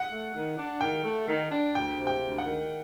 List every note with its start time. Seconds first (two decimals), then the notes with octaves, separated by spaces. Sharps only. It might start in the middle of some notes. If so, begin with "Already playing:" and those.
Already playing: F#5
0.11 A3
0.35 D#3
0.58 D4
0.81 D#3 G5
1.04 A3
1.28 D#3
1.51 D4
1.75 D2 G5
1.99 C3
2.07 G5
2.22 D2
2.38 F#5
2.45 D#3